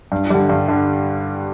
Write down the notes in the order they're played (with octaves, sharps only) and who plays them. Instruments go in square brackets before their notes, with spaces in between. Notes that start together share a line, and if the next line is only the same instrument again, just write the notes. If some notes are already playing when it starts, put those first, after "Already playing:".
[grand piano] G2
D3 G3
G2
D3